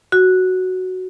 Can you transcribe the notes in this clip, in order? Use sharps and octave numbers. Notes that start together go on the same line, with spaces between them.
F#4